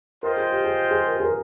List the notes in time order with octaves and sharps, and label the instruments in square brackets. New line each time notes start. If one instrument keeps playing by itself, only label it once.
[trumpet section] F4 C5 D#5 G5 [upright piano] A#4
[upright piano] G#4
G4
G#4
G#4
A#4
G#4
A#4